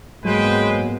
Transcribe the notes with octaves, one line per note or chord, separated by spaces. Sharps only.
G#2 F#3 G#3 A#3 B3 B4 C5 G5